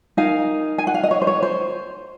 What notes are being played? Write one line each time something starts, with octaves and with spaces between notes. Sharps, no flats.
D#4 A#4 F5 G#5
G#5
F#5
F5
D#5
C#5
C5
C#5
C5